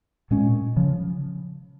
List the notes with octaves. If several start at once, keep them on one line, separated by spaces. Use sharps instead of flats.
A#2 G#3 C#4
C#3 F3